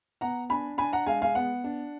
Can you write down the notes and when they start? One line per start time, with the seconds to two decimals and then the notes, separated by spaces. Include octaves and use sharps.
0.21 B3 F#5 A#5
0.50 D4 G#5 B5
0.78 D4 G#5 B5
0.93 F#5 A#5
1.06 G#3 F5 G#5
1.22 F5 G#5
1.35 B3 F#5
1.64 D4